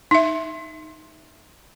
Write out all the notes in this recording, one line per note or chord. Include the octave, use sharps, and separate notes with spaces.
D#4 E5